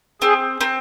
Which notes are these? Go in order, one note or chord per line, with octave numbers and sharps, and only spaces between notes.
C4 G#4
C4